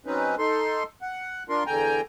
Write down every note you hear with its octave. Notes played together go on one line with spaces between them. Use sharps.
F#3 C4 C#4 D#4 B4
D#4 A4 C6
F#5
D4 F4 A#4 C6
E2 D3 G5 G#5 A#5